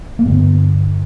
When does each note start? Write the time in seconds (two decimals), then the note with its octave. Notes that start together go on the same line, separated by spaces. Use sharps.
0.19 A#3
0.25 G2 D3 B3